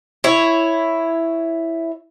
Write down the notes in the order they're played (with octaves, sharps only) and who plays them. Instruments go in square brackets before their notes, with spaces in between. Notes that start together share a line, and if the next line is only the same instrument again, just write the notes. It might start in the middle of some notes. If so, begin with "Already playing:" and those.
[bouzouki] E4 C#5